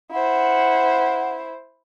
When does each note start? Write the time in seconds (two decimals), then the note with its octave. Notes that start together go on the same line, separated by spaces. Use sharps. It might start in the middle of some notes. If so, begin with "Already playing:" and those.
0.12 E4 C5 F#5